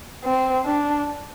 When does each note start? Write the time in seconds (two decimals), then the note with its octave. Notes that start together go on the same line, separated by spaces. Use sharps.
0.24 C4
0.65 D4